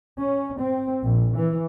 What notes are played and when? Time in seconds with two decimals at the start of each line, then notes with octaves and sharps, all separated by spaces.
0.19 C#4
0.59 C4
1.03 A#1
1.36 E3